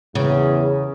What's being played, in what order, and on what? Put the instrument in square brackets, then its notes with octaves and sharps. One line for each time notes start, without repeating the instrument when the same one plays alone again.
[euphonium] E2 [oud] C#3